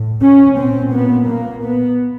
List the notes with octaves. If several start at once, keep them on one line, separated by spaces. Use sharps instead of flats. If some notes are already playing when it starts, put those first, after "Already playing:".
Already playing: A2
C#4
A#2 C4
B3
A#3
B3